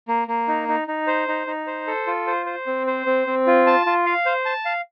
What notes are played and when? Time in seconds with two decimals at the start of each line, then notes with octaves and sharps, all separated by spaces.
0.08 A#3
0.28 A#3
0.48 D#4
0.68 D#4
0.88 D#4
1.07 C5
1.28 D#4
1.47 D#4
1.67 C5
1.87 A4
2.07 F4
2.27 C5
2.46 C5
2.67 C4
2.87 C5
3.06 C4
3.27 C4
3.47 F4
3.67 A5
3.86 F4
4.06 F5
4.26 C5
4.45 A5
4.65 F5